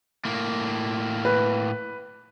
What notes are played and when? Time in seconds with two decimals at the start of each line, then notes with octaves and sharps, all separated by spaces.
0.25 A2 A#3
1.25 B4